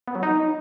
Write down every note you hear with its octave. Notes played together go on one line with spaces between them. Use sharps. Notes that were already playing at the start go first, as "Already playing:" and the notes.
B3
F#3
D#4